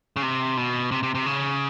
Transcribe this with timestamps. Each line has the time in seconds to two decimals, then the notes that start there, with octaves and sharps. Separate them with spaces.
0.16 C#3
0.22 C3
0.57 B2
0.91 C3
1.03 C3
1.15 C3
1.26 C#3